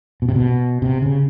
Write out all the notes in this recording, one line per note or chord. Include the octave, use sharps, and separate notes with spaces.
B2
C3
B2
C3
C#3